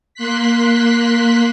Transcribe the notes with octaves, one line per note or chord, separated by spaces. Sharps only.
A#3 C6 F#6 B6